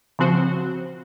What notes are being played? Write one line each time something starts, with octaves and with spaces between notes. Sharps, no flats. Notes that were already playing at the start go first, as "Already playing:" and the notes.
C#3 F3 C4 F#4 C5